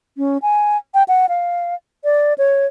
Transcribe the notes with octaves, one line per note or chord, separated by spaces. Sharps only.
C#4
G#5
G5
F#5
F5
D5
C#5